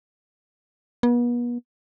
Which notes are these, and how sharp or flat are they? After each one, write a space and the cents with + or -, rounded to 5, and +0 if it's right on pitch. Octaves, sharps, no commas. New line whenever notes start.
B3 -40